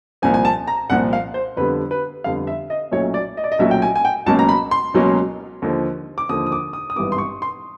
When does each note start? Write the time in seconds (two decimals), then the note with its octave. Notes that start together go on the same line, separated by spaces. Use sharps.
0.22 C2 A#2 F3 G#5
0.34 G#5
0.45 A5
0.67 A#5
0.90 C2 A#2 F3 F#5
1.13 F5
1.34 C5
1.57 F2 D3 G3 B3 B4
1.91 B4
2.24 F2 D3 G3 B3 F5
2.47 E5
2.70 D#5
2.91 B1 A#2 F#3 A3 C#4 C#5
3.14 D5
3.37 D#5
3.44 D5
3.52 D#5
3.59 B1 A#2 F#3 A3 C#4 E5
3.71 G5
3.82 G#5
3.95 G#5
4.05 G5
4.26 C#2 B2 F#3 A#3 C#4 A5
4.39 A#5
4.49 B5
4.71 C6
4.94 C#2 B2 F#3 A#3 C#4
5.62 D#2 D3 F3
6.18 D6
6.29 D#2 D3 F3 D#6
6.46 D#6
6.52 D6
6.73 D#6
6.90 D#6
6.96 G#1 G2 E3 G3 B3 D6
7.12 C6
7.18 C#6
7.42 C6